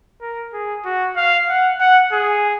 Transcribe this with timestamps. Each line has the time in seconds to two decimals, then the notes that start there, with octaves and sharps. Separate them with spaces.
0.21 A#4
0.53 G#4
0.85 F#4
1.17 F5
1.49 F#5
1.81 F#5
2.13 G#4